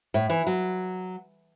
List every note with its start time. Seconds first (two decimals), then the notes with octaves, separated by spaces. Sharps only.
0.14 A2
0.30 E3
0.47 F#3